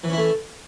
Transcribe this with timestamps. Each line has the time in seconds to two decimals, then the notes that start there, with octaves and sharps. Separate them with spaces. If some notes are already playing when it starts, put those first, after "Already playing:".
0.04 E3
0.08 C#4
0.13 E4
0.18 A3